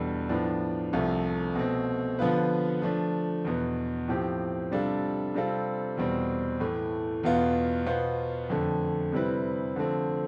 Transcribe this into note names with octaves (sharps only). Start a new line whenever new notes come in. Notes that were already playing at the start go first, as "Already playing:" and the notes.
Already playing: E2 B2 G3 D4 A4
A2 F3 B3 D4
C2 C3 F3 A3
B2 A3 C4
D3 F3 B3 F4 B4
F3 A3 D4
E2 B2 B3
A2 F3 C4 G4
C3 G3 D4 F4 A4
C3 G3 C4 F4 A4
E2 B2 G3 C4
A2 E3 A3
E2 B2 B3 F4
B2 B3 F4 C5
F2 D3 A3
C3 G3 C4 E4 B4
D3 F3 A3 C4